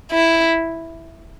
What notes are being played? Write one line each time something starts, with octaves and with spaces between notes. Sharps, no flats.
E4